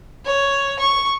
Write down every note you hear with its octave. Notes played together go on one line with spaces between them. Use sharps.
C#5
C#6